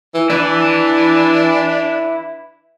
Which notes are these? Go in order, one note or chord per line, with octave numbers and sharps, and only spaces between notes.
E3
D4 E4 B4